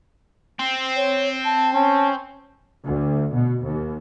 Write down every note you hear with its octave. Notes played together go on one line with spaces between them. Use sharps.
C4
C#5
A5
C#4 A5
D2
B2
D#2